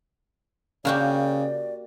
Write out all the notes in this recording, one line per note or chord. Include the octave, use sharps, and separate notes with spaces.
C#3 A#3 F#4 G4 D5